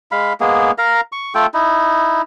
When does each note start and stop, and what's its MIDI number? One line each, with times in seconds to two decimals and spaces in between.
0.12 0.33 56
0.12 0.33 77
0.12 0.33 83
0.40 0.71 56
0.40 0.71 58
0.40 0.71 59
0.40 0.71 68
0.78 1.01 70
0.78 1.01 77
0.78 1.01 82
1.12 1.33 85
1.35 1.46 57
1.35 1.46 65
1.35 1.46 69
1.35 1.46 79
1.54 2.22 63
1.54 2.22 64